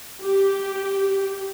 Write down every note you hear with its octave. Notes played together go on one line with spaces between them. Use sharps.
G4